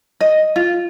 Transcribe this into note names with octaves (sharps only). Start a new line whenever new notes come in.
D#5
F4